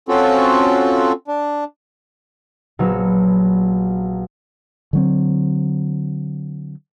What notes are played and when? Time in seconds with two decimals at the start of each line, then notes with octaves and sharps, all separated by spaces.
0.09 C4 C#4 F4 F#4 A4
1.28 D4
2.79 A#1 F#3 B3 E6 C#7
4.93 D3 F#3 C4